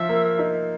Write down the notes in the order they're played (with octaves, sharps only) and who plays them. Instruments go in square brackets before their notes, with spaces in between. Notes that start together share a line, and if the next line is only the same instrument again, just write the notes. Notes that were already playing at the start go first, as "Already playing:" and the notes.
Already playing: [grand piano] F3 [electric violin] E5
[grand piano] A#3
D#4